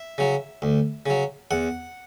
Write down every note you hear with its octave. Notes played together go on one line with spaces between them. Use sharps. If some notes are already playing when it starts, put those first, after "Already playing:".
Already playing: E5
C#3 F#3
D2
C#3 F#3
E2 F#5